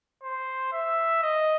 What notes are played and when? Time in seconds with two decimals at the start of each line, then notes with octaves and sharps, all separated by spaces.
0.23 C5
0.73 E5
1.23 D#5